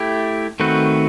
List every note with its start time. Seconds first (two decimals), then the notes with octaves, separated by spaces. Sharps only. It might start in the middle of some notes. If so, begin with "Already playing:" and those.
Already playing: A3 E4 G4
0.60 D#3 A3 C4 F#4 B4